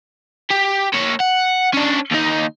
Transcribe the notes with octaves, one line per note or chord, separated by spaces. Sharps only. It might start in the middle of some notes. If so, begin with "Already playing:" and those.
G4
A#3 C#5
F#5
C#4 D4
D#2 D#4